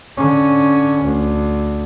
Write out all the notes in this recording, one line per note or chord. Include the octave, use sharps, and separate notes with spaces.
D3 C#4
D2